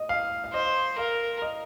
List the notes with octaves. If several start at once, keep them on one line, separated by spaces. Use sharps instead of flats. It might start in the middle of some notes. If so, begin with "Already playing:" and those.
Already playing: D#5
F5
F5
C5 D#5
A#4 F5
D#5